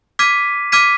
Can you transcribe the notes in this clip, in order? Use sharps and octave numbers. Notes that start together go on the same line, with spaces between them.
D6 F6 G#6 B6 D#7
D6 F6 G#6 B6 D#7